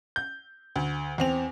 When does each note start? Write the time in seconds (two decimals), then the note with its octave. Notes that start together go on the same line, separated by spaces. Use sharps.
0.16 G6
0.76 D2
1.18 E2 C4 F7